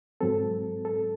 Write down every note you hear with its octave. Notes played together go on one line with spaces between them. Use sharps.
G#2 F#3 C4 A4
A4